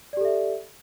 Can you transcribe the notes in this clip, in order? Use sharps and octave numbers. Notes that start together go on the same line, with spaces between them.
G4 A4 D5 E5